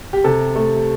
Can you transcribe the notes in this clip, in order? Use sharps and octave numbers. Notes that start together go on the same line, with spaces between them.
G4
C3 A4
A3